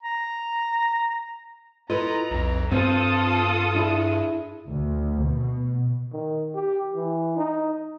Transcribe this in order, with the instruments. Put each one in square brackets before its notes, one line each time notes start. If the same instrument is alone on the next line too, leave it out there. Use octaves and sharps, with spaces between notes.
[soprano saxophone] A#5
[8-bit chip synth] E4 F4 [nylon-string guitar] A4 B4 D#5 [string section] A#5
[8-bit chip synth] B1 F2
[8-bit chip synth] G2 [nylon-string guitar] C4 [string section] F4 A4 D#6
[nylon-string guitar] D4 E4 G#4
[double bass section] D2
B2
[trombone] D#3
G4
E3
D#4